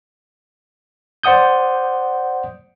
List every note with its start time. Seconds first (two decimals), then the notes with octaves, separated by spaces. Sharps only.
1.23 C5 D5 F#5 D#6 G6